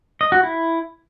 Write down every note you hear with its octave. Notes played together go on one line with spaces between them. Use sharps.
D#5
F#4
E4